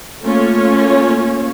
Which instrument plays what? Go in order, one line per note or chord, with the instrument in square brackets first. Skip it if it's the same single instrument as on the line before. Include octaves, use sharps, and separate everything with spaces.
[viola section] A3 A#3 C#4 F4 C#5